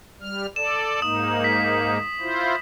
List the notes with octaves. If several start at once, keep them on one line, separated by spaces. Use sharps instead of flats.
G3 F6
A4 D5 E7
G#2 A#3 D#4 D#6
B6
E4 F4 C5